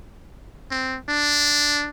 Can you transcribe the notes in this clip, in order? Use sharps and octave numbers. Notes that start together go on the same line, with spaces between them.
C4
D4